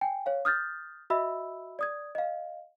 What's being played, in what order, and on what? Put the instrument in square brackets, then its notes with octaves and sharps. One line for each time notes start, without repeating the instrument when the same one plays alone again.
[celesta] G5 G#5
C#5 F5
D#6 F6 G6 A6
F#4 D#5 E5 B5 E6
D5 D#6 G#6
D#5 F5